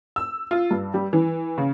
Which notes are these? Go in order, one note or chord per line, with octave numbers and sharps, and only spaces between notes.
E6
F4
G2
G3
E3
C#3